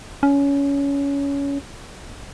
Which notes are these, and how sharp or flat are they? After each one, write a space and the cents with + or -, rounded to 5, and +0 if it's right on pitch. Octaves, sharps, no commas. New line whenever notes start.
C#4 +20